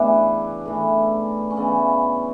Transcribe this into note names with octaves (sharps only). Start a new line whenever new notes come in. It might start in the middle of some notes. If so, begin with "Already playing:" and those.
Already playing: A2 C#3 E3 B3 D4
A2 E3
C#4
C#3 E3 B3